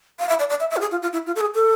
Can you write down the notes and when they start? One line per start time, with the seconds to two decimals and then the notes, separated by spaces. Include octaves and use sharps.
0.19 F5
0.29 E5
0.39 D5
0.50 D5
0.60 E5
0.71 E5
0.76 F4
0.81 G#4
0.92 F4
1.02 F4
1.13 E4
1.27 F4
1.36 A4
1.41 G#4
1.55 A4